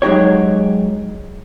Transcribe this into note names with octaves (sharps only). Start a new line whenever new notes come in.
F#3 G#3 D#4 G4 C#5